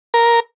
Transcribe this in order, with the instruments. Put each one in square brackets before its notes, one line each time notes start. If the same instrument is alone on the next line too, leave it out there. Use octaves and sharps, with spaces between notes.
[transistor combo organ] A#4